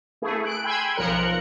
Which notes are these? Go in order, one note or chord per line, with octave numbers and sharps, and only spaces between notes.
A3 E4 G#4
F#6 D7
G5 G#5 B5 C6 E6 G#6
B1 F3 A#4 F#6 C#7